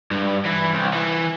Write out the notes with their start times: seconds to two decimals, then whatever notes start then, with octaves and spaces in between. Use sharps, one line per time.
0.11 G2
0.45 E3
0.73 C2
0.93 E3